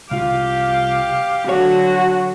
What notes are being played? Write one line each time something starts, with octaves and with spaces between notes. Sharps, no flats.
C2 F4 G4 F5
D3 F#3 F#4 C#5